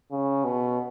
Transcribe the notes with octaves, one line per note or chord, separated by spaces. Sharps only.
C#3
B2